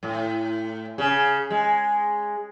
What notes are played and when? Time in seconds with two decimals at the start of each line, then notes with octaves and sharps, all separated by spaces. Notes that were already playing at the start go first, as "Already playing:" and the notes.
0.03 A2
0.98 C#3
1.50 G#3